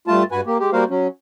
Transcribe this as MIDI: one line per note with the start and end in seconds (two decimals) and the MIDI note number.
0.08 0.23 43
0.08 0.23 57
0.08 0.23 65
0.08 0.23 81
0.32 0.41 43
0.32 0.41 66
0.32 0.41 71
0.32 0.41 80
0.47 0.58 58
0.47 0.58 67
0.60 0.70 56
0.60 0.70 67
0.73 0.84 55
0.73 0.84 58
0.73 0.84 66
0.73 0.84 70
0.73 0.84 72
0.73 0.84 77
0.90 1.07 54
0.90 1.07 61